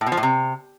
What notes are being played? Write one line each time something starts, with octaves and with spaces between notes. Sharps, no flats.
A2
B2
F3
A2
C3